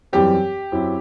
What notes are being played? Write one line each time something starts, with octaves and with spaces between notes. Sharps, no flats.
F#2 E3 G3 C4 G4
F#2 F#3 C4 E4